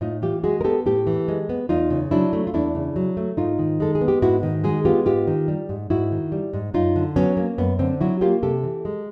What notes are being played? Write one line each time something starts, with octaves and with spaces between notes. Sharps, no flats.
A2 D#4 F4
E3 F4 G4
G#3 F#4 G#4
A#4
B3 G4 A4
A2 G4 A4
E3
G#3
B3
E2 D#4 F4
C#3
F#3 D4 E4
A3
F4
E2 D4 E4
C#3
F#3
A3
G#2 D#4 F4
D#3
G#3 A4
G#4
B3
G4
G#2 E4 F#4
D#3
G#3 F#4 G#4
B3 F4 G4
G#2 F4 G4
D#3
G3
G#2
G#2 E4 F#4
D#3
G3
G#2
F#2 D#4 F4
D3
F#3 B3 C#4
A#3
F#2 B3
D3 C4
F#3 E4 F#4
A#3 F4 G4
C3 G4 A4
E3
G#3